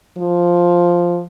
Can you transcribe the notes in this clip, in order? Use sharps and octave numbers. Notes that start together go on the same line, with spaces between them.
F3